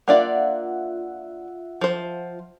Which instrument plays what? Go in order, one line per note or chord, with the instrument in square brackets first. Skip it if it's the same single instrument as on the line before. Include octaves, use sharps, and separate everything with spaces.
[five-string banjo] A#3 D4 D5 [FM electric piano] F4 E5 F#5
[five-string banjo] F3 C5